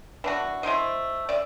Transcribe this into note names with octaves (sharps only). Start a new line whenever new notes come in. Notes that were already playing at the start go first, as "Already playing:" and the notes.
E3 D4 F#4
A3 E4 C5 D#5
D5 E5